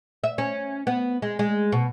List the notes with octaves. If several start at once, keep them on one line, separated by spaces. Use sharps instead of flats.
E5
C#4
B3
G#3
G#3
B2